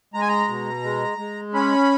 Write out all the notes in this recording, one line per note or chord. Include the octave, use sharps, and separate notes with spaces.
G#3 A#5
G#5
A#5
B2
G#3
G#3
C#4 B5